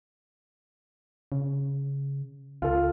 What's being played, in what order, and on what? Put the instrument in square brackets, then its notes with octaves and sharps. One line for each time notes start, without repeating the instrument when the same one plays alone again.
[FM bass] C#3
[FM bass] C#2 [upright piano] F4 A4